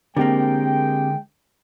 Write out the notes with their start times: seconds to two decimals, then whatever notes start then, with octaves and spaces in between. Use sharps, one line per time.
0.17 D3 G#3 A#3 C4 G4 A#4 G5